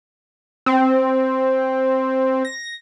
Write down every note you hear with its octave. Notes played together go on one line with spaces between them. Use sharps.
C4
A#6